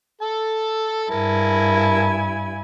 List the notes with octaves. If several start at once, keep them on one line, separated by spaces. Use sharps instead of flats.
A4 A5
G2 E4 A#4 G#5 A5